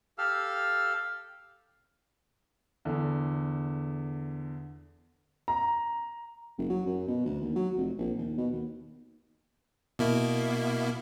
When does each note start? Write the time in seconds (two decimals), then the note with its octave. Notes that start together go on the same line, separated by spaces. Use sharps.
0.18 G4 A4 F5 E6 F6
2.85 E2 D3
5.48 A#5
6.58 F#1
6.70 F#3
6.86 F#2
7.07 B2
7.26 D2
7.42 D#2
7.56 F#3
7.77 F1
7.98 A#1
8.18 D#2
8.38 B2
8.53 D#2
9.99 B2 A#3 E4